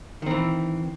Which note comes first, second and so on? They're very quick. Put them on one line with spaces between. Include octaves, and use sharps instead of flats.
D#3 C4 E3